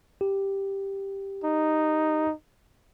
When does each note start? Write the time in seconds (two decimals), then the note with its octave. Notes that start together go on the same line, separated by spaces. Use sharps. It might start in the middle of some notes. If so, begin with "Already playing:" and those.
0.21 G4
1.44 D#4